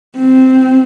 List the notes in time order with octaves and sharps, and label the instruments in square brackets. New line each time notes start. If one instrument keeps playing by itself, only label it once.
[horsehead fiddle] C4